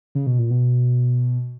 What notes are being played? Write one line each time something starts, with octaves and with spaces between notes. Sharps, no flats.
C#3
B2
A#2
B2